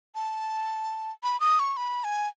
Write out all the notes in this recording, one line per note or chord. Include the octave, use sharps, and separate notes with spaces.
A5
B5
D#6
C#6
B5
G#5